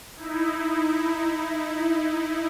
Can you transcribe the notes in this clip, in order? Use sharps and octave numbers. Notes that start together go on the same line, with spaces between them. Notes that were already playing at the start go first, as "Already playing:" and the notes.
D#4 E4